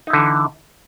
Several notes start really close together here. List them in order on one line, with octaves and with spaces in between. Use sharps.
D#4 E4 D3 E3